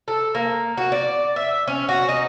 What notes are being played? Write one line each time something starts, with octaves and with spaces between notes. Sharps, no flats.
A4
A#3
F#4
D5
E5
C#4
F#4
D#4